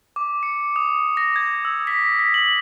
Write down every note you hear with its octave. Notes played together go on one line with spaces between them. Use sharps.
D6
C#7
D#6
A#6
G#6
E6
B6
B6
F#7